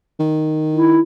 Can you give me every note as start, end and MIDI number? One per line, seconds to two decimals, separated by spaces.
0.20 1.00 51
0.73 1.01 64